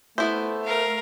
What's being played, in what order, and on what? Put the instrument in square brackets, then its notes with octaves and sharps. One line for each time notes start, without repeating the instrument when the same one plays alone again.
[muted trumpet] A3 [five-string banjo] B3 E4 C5 [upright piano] E5
[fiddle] A#4 F5